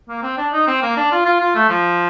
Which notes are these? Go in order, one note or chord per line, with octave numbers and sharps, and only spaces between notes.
A#3
C4
D4
D#4
C4
A#3
D4
F4
F4
F4
A3
F3